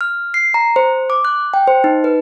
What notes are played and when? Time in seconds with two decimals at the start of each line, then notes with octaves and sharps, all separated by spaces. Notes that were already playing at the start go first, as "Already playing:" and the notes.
0.01 F6
0.34 C7
0.54 A#5
0.76 C5
1.10 D6
1.25 F#6
1.54 G5
1.67 C5
1.84 D#4
2.04 B4